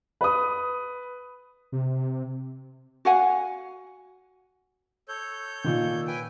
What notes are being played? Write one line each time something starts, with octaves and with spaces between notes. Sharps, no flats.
B4 D#6
C3
F#4 F5 F#5 G#5
A4 C#5 G6
A#2 D#3
B4 G5 G#5